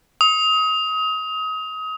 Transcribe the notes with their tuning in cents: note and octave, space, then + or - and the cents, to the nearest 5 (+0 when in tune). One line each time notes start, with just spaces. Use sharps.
D#6 +30